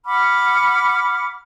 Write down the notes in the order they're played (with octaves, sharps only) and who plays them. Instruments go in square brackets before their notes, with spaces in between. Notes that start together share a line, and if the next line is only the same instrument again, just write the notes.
[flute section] F#5 B5 D6 F6